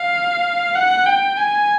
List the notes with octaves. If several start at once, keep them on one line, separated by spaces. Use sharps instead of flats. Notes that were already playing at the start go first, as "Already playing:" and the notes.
Already playing: F5
F#5
G5
G#5